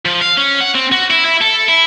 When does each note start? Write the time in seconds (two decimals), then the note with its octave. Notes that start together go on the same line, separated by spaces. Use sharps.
0.06 F3
0.21 F5
0.37 C#4
0.60 F#5
0.75 C4
0.92 F#4
1.11 E4
1.25 E4
1.41 A4
1.69 E4